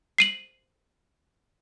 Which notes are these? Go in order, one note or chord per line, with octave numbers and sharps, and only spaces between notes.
C7 D#7 F#7